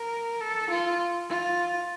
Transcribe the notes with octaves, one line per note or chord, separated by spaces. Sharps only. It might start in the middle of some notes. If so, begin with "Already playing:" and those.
Already playing: A#4
A4
F4
F4